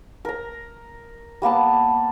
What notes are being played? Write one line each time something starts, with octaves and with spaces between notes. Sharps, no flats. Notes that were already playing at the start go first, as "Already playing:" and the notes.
A#4 A#5
G3 A#3 B3 A5